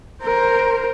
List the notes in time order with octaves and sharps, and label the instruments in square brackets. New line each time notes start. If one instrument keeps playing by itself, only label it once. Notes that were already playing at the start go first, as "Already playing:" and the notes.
[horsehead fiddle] A#4 C5